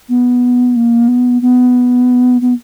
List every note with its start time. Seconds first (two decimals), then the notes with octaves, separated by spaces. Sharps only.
0.09 B3
0.76 A#3
1.08 B3
1.42 B3
2.41 B3